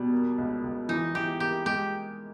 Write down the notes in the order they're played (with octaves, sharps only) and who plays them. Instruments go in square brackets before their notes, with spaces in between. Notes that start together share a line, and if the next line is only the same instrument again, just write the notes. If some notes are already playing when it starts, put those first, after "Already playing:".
Already playing: [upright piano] B2 [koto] G3
[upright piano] A#3
C#2
C#2
[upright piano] E3 [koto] D#4
[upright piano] E3 [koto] G4
[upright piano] A#3 [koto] G4
[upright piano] G#3 [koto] G4